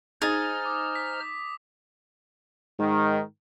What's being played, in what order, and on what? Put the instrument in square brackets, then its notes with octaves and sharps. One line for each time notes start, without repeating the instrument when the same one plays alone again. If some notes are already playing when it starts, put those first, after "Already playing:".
[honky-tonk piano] D#4 A6 [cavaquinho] G#4 [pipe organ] C5 A#5 F6 [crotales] D#6
[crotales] D6
B6
[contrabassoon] G#2 [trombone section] D#3